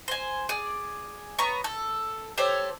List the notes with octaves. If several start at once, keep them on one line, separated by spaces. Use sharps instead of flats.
C5 G#5
G#4 D5
B3 C#5 A#5 C#6
A4
G4 A4 C5 C#5